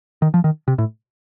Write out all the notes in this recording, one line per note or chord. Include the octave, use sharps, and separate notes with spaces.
D#3
F3
D#3
C3
A2